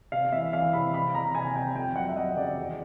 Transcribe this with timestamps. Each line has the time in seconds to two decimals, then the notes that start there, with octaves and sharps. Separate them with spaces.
0.12 C3 F5
0.32 E3 E5
0.53 E3 F5
0.73 C3 B5
0.94 C3 B5
1.14 C3 A#5
1.35 C3 G#5
1.55 C3 G5
1.76 F2 G5
1.96 F#3 F#5
2.08 E5
2.16 F#3 D#5
2.37 C#3 D5
2.57 E2